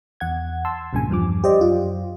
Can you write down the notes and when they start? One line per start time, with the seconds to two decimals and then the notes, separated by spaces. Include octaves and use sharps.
0.20 E2 F#5 G#6
0.65 A5 C6 E6
0.93 B1 G2 A#2 C#3 G#5
1.10 E2 G2 F3 D6
1.44 G4 C5 D5 D#5
1.61 F#2 F4